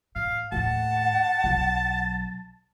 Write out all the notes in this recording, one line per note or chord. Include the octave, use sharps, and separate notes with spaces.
A2 F5
D#2 A2 F#5 A5
B1 F#3